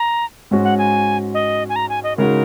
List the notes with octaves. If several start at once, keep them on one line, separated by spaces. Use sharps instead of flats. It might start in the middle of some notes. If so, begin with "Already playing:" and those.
Already playing: A#5
G#2 G#3 C#4 F#4
F#5
G#5
D#5
G#5
A#5
G#5
D#5
C#3 G#3 D#4 F#4 A#4